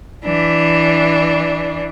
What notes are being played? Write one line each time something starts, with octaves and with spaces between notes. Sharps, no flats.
E3 D4